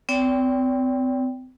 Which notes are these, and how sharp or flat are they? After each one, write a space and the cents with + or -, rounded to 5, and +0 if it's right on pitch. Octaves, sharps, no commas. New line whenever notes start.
C4 -35 D5 -45 G5 +0